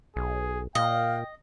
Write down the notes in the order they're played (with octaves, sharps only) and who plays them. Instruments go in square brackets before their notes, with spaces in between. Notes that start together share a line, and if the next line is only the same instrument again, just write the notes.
[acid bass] B1 [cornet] G#4
[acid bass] A#2 [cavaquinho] D#5 [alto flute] F5 [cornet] G5